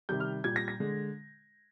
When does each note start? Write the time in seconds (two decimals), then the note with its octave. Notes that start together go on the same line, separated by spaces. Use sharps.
0.09 C3 D#3 G3 G6
0.20 F6
0.44 A#2 G3 G#6
0.56 A#6
0.68 A#6
0.80 D3 G#3